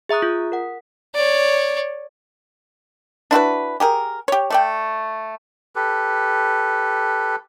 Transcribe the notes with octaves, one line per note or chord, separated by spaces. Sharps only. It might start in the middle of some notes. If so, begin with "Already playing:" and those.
G#4 E5 A#5 D#6 F#6
F4
A#4 F#5
C#5 D5
D4 E4 F#4 B4
G4 G#4 A#4
G4 C#5
A3 D5 G5
G4 A4 B4